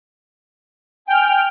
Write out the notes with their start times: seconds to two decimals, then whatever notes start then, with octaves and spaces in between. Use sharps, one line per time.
1.07 G5 G#5 F6